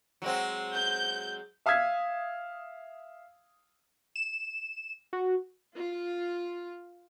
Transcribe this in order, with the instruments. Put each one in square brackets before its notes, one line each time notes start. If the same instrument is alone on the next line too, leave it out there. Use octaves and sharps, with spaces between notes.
[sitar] F#3 G#3 C4
[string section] G6
[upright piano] E5 F5 D#6 E6 G#6 B6
[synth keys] E7
F#4
[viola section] F4